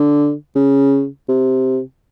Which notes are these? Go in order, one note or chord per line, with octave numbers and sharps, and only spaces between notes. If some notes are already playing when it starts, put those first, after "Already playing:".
Already playing: D3
C#3
C3